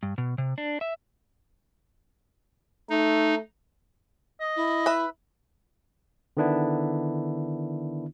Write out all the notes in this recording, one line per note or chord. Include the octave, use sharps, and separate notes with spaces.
G2
B2
C3
D4
E5
A3 D#4
D#5
E4
B4 E5
D3 D#3 B3 D4 E4